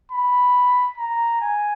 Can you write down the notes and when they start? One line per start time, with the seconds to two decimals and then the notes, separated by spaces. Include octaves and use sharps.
0.12 B5
0.98 A#5
1.42 G#5